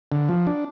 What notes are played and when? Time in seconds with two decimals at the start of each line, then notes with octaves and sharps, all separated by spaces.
0.12 D3
0.29 F3
0.47 D4